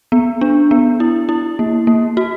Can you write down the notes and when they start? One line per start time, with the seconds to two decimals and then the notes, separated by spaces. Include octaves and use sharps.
0.12 B3
0.41 D4
0.71 B3
1.00 E4
1.29 E4
1.59 A#3
1.87 A#3
2.17 F#4